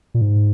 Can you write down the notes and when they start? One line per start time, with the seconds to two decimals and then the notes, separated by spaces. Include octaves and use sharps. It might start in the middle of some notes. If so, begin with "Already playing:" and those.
0.14 A#2
0.21 G#2